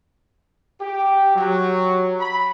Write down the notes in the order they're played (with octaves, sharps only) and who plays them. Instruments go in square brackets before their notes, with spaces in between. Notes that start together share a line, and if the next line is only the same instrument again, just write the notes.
[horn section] G4
F#3
B5